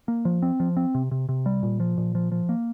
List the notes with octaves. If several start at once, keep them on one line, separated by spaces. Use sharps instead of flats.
A#3
F3
C4
F3
C4
C3
C3
C3
G3
A#2
F3
A#2
F3
F3
A#3